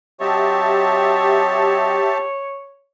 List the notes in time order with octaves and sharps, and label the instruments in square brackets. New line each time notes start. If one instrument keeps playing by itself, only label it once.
[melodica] F#3 C4 D#5 [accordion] G4 E5 A5 [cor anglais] C#5